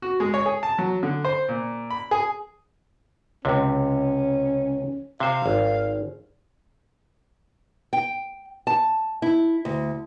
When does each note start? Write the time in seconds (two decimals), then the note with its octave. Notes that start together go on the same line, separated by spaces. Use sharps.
0.02 F#4
0.20 G#3
0.34 C#5
0.46 G#4
0.63 A5
0.79 F#3
1.03 D3
1.25 C5
1.49 A#2
1.90 B5
2.11 G#4
3.45 C#2 C3 C#4
5.20 C3 C5 F5
5.46 G#1
7.93 G5
8.67 A5
9.22 E4
9.65 D2